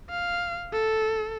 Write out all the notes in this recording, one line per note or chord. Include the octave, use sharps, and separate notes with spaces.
F5
A4